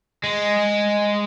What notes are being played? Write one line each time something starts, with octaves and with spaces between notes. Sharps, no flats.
G#3